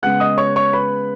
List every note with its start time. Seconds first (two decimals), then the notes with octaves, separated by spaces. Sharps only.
0.02 C#3 G#3 B3 F#5 F#6
0.20 D#5 D#6
0.38 C#5 C#6
0.56 C#5 C#6
0.73 B4 B5